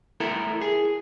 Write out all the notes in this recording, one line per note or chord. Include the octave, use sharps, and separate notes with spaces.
E4 A4 A#4
G#4